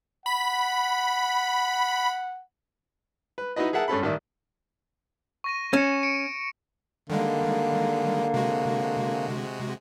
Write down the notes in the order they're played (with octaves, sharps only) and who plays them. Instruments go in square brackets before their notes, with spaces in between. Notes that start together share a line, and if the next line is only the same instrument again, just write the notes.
[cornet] F#5 [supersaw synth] B5
[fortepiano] B4
D#4 E4 F#4 B4 D#5
G#4 A#4 E5 F#5 A5
G2 C#4 A4 B5
A1 D#3 D5 E5
[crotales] C#6 A#6 D#7
[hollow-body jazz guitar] C#4 [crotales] C#7 E7
[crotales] C#7 D7
[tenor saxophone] D3 [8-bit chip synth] D#3 G3 G#3 [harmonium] A#3
[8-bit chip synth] C3 G#3 F#4